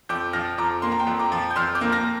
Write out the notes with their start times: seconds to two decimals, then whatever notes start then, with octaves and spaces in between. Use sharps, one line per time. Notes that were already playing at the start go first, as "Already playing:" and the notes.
0.09 F2 D6 G6
0.33 F3 F6 A#6
0.58 F2 A#5 D6
0.82 A#3 C6
0.92 A#5
0.99 G5 C6
1.07 F2
1.19 A#5 D6
1.32 F3
1.51 G6
1.56 F2 C6 F6
1.75 D6 G6
1.81 A#3
1.92 F6 A#6